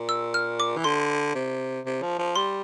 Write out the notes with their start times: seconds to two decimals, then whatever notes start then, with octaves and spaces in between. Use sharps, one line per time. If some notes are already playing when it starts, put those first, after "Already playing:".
Already playing: A#2
0.09 E6
0.34 F6
0.60 D6
0.77 E3
0.84 D3 C6
1.35 C3
1.86 C3
2.02 F3
2.18 F3
2.36 G3 C6